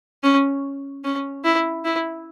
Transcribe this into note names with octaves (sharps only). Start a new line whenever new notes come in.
C#4
C#4
E4
E4